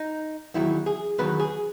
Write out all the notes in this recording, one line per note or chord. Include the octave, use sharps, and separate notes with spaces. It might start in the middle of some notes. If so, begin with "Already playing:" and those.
Already playing: D#4
E2 D#3 F#3 E4
G#4
E2 D#3 F#3 B4
G#4